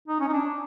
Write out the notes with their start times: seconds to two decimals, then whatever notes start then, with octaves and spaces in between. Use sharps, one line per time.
0.08 D#4
0.20 C#4
0.28 D#4
0.33 D4